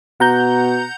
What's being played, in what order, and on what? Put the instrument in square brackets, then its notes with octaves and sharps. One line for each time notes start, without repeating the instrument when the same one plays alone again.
[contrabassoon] B2 [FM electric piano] F#5 A#5 G6